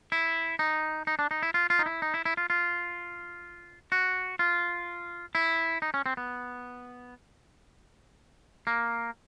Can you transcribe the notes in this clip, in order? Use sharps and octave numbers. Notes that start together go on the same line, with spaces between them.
E4
D#4
D#4
D4
D#4
E4
F4
F4
D#4
E4
D#4
E4
E4
F4
F4
F#4
F4
E4
D#4
C#4
C4
B3
A#3